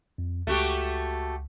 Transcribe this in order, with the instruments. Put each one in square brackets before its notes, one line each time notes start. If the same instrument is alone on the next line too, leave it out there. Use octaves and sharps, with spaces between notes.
[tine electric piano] F2
[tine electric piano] C#2 [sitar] A3 F#4 G4